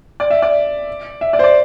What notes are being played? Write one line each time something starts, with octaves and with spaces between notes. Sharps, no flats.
D5
E5
D5
E5
D5
C5
D5